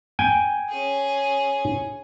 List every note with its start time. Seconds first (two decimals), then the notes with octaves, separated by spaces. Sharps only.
0.19 G5 G#5
0.69 C#4 G#4